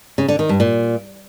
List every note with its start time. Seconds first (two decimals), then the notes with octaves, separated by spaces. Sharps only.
0.18 C#3
0.28 D3
0.39 D#3
0.49 G2
0.60 A#2